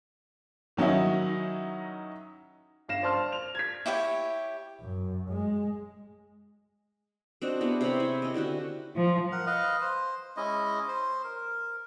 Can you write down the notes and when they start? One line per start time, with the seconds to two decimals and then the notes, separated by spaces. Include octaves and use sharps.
0.77 D#3 F#3 C#4 D#4 E4
2.88 G1 C#3 F5 A#6 E7
3.03 C5 D5 A5 C6 F6
3.32 F7
3.55 G#6 B6
3.86 E4 G4 C#5 G5
4.81 F#2
5.30 G#3
7.42 C4 D4 F#4 D#5
7.61 B3 E4 G4 G#4
7.81 C3 C#5 A#5 B5
8.00 E4
8.22 C#4 D#5
8.34 D3 E4 F#4 G4
8.95 F3
9.32 A#4 F#5
9.47 B4 D#5 F5
9.81 C5
10.37 G#3 C#4 E4 D#5
10.88 C5
11.24 A#4